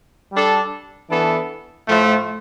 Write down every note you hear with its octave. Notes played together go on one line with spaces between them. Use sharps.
G3 D4 A4
E3 B3 D4 A4
A2 F3 A3